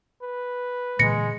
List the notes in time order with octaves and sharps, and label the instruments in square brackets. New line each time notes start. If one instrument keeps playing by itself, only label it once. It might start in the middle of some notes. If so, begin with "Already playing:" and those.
[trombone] B4
[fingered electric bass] A#2 D3 E3 [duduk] G#3 [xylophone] A#6 C#7